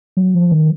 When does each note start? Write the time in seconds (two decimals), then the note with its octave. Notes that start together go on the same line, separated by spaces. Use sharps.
0.17 F#3
0.35 F3
0.52 D#3